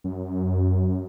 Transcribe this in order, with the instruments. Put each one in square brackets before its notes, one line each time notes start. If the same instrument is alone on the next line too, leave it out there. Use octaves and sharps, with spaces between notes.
[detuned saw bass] F#2